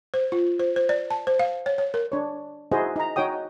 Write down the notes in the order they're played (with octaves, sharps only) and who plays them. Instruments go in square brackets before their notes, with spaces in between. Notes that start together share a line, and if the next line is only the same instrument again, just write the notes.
[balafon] C5
F4
C5
C5
D5
A5
C5
F5
C#5
C#5
A#4
[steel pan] D4 C#5
D#4 E4 F#4 G#4 C5 D#5
D#4 A#5
D#4 F#4 C#5 G5 D#6